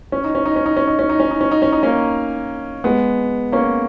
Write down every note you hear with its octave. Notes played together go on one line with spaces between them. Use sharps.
C#4
D#4
C#4
D#4
C#4
D#4
C#4
D#4
C#4
D#4
C#4
D#4
C#4
D#4
C#4
D#4
A#3 C#4
G#3 B3
A#3 C#4